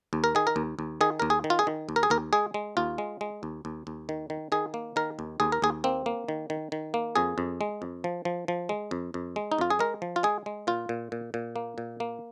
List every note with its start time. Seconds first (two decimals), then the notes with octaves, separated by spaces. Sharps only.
0.13 D#2
0.24 A#4
0.35 D#3 G#4
0.47 A#4
0.56 D#2
0.79 D#2
1.01 D#3 G#4
1.20 D#2 A#4
1.30 G#4
1.44 D#3
1.50 F4
1.59 G#4
1.67 D#3
1.89 D#2
1.96 A#4
2.03 G#4
2.10 D#2 A#4
2.33 G#3 G#4
2.54 G#3
2.77 D#2 F4
2.98 G#3
3.21 G#3
3.43 D#2
3.65 D#2
3.87 D#2
4.09 D#3
4.30 D#3
4.52 D#3 G#4
4.74 A#3
4.96 D#3 A#4
5.19 D#2
5.40 D#2 G#4
5.52 A#4
5.62 D#2 G#4
5.84 A#3 C4
6.06 A#3
6.28 D#3
6.50 D#3
6.72 D#3
6.94 A#3
7.16 F2 G#4
7.38 F2
7.61 G#3
7.82 F2
8.04 F3
8.25 F3
8.48 F3
8.69 G#3
8.91 F2
9.14 F2
9.36 G#3
9.52 D#4
9.58 F2 F4
9.70 G#4
9.79 G#3 A#4
10.02 F3
10.16 F4
10.23 G#3 G#4
10.46 G#3
10.67 A#2 F4
10.89 A#2
11.12 A#2
11.34 A#2
11.56 A#3
11.78 A#2
12.00 A#3